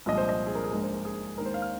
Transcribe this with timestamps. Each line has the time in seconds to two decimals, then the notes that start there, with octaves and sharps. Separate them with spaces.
0.06 C2 A#2 F3 G#3 D#5
0.18 C5
0.29 D#5
0.47 G#4
0.55 A#4
0.64 G#4
0.71 A#1 G#2 G#3 A#4
0.83 C5
0.94 A#4
1.05 G#4
1.37 D#2 D#3 G#3 A#4
1.46 C5
1.54 F5
1.62 F6